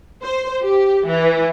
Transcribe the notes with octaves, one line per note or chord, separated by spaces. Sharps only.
C5
G4
E3